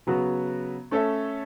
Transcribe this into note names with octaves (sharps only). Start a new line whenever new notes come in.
C#3 F#3 B3 F#4
A3 C#4 A4 C#5 E5